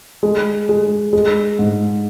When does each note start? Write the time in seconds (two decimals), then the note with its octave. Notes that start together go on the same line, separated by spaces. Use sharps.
0.23 G#3
0.69 G#3
1.13 G#3
1.59 G#2